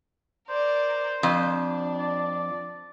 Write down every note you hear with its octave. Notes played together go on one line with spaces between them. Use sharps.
A#4 C5 D5
F2 D4
D5